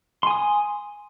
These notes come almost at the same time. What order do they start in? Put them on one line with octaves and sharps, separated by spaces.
C6 G#5 D#6